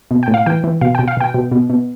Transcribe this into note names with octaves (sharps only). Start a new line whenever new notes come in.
B2
G5
A2
F5
E3 G5
E3
B2 F5
G5
B2
F5
B2 G5
B2
B2
B2